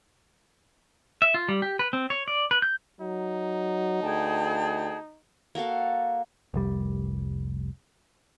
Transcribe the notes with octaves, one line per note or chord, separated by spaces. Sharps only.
E5
F4
G3
G4
B4
C4
C#5
D5
B4
G6
F#3 D#4
D2 G#4 G5 A5
A#3 F#4 A4 F5
F1 C2 G3